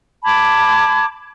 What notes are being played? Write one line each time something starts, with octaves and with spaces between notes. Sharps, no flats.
A5 B5 D6 G#6